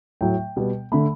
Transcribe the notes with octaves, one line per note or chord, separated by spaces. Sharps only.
A2 F#3 A3 G5
B2 G3 B3
D3 A3 B5